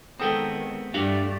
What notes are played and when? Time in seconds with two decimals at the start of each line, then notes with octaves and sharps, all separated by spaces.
0.20 D#3 G#3 B3 C4 A4 G5 D#6
0.94 G2 A3 D4 F#4 G4 D5 F5